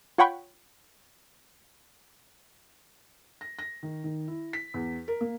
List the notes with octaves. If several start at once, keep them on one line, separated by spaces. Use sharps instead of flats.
F4 C#5 F#5 G5 B5 C#6
A#6
A#6
D#3
D#3
E4
B6
E2
A#4
A#3